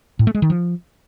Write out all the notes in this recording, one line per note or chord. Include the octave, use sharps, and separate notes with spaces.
A2
A3
G#3
D#3
F3